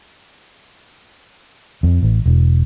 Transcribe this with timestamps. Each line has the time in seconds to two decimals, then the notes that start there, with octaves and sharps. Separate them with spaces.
1.83 F2
2.03 A1
2.26 E1